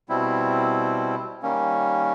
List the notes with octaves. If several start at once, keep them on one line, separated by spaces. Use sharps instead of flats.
B2 G3 C4 E4
D#3 G3 A#3 C#4